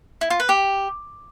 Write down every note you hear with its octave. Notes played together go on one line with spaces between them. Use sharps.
E4
F4
B4
G4